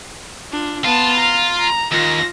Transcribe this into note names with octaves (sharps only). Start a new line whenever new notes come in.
D4 F4
B3 F4 A5
A#5
A#5
D#2 F4 A#6